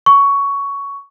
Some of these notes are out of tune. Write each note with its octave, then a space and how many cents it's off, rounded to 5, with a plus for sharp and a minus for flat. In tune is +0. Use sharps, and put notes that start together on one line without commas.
C#6 +10